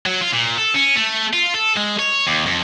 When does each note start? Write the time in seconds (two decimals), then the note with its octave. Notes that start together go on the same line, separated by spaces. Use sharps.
0.06 F#3
0.21 F4
0.33 A#2
0.58 A4
0.74 C#4
0.96 A3
1.33 F4
1.54 A4
1.77 G#3
1.99 C#5
2.27 D#2
2.46 F2